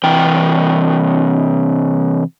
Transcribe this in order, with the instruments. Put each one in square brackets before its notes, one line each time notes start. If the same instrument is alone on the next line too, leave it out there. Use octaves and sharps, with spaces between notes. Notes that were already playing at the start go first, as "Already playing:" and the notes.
[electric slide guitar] C3 E3 G5